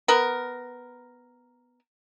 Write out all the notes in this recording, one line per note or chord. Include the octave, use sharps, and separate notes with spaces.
B3 A#4